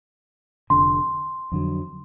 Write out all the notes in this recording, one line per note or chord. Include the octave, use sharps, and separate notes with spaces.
F1 F2 D3 C6
F2 D3 F#3